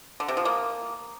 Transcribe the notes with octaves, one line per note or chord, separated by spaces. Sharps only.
D3
C3
F3
A#3